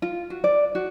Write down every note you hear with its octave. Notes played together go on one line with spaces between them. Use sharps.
F4
F#4
D5
F#4